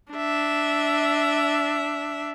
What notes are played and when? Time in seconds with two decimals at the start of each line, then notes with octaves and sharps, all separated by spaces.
0.12 D4 E5